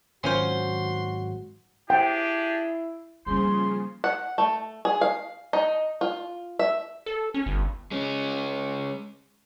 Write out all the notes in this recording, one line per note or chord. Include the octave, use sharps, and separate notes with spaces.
G#2 D#3 F#3 C#4 F4 F#4 C5 C6
D4 E4 G4 G#4 G5
C#3 F3 G3 A#3 G#4 C6
F#5
A3
G#4
F5
D#4
F4
E5
A4
C#4
G1
G#3 C#4